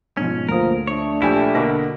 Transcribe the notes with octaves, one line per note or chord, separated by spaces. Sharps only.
G#2 B2 F3 C#4
D2 F3 A#3 A#4 D#6
A3 D4 C#5
A#1 E4 G4 G#5
B2 D3 A#3 B5 D6 A#6